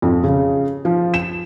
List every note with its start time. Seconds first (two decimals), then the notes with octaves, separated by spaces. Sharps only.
0.02 F2
0.24 C#3
0.85 F3
1.14 E7